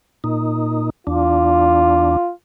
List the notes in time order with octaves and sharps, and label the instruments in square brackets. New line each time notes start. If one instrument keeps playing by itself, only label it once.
[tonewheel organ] A#2 D#4
[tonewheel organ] E2 D4 [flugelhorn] F4